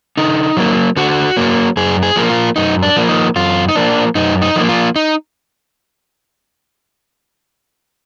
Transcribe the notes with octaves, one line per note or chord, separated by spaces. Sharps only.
D3 D#4
F#3 A#3
D3 F#4
F#3 A#3
F#2 G#4
G#4
F3 A#3
F4
F#2 D#4
D4
F3 A#3
D#4
F#2 F4
D#4
F3 A#3 D4
F#2 D#4
D#4
F3 A#3
F4
D#4